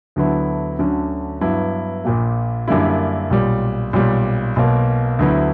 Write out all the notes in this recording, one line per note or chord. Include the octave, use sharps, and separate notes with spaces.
D2 D3 F#3 B3 E4
D2 D3 F#3 C#4
G2 F#3 B3 E4
A#1 A#2 A#3
F#2 D3 G3 A#3 E4
B1 A#2 G3
B1 A#2 G3
B1 B2 A#3
D2 D3 F#3 B3 E4